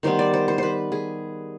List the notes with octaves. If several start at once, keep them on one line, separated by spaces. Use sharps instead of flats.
D#3 G3 B3 C5
D5
C5
C5
B4 C5
G#4